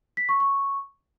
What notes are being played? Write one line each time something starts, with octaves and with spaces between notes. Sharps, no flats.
B6
C#6
C#6